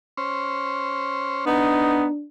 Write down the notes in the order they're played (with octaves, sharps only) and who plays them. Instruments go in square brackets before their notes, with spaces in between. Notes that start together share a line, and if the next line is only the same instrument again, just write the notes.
[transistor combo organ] C#4 C5
[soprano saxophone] B3 [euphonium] D4 [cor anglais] D#4